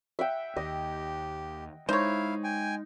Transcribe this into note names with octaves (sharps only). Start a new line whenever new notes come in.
E5 F#5 G5
D#2 G4 D#5
G#3 D#4 E4 C5 C#5 F5
G5 G#5